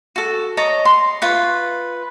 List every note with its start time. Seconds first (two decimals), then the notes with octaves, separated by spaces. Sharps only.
0.16 F#4 A4
0.57 C#5 D#5 A5 A#5
0.85 C6
1.22 F4 B4 C#6